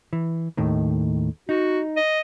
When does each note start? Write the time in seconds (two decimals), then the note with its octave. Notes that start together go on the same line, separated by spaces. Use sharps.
0.13 E3
0.57 D#2 A2 D#3
1.49 D#4 F#4
1.96 D#5